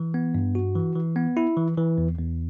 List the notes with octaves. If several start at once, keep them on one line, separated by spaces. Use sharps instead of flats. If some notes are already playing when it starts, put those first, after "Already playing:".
Already playing: E3
B3
G2
F#4
E3
E3
B3
E4
E3
E3
E2
E2